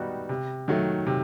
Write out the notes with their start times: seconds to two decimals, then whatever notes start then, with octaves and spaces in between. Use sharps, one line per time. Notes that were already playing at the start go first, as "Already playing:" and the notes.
Already playing: D#3 G3 B3 D#4 F#4
0.29 C3
0.68 D#3 F#3 A3
1.07 C3